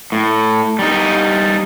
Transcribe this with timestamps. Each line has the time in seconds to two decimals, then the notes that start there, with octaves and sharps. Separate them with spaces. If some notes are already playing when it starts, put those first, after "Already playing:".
0.12 A2
0.79 G3 D#4